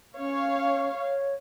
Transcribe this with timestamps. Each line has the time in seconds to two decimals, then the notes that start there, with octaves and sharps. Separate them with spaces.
0.17 C#4 C#5 F5
1.00 C#5